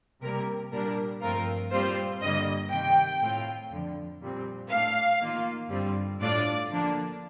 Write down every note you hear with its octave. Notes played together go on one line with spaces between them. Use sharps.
C3 G3 A#3 A#4
A#2 G3 A#3 D4 A#4
G2 F3 A3 C4 F4 A#4
A#2 G3 C4 F4 C5
G2 D3 G3 A#3 D#5
C3 D#3 A#3 G5
A2 A3 C4 F4
F2 D3 F3
A#2 G3 C4
A2 A3 D4 F5
D#3 A#3 F4
G2 D3 G3 C4 F4
A2 A3 D4 F4 D5
D3 F3 A#3 D4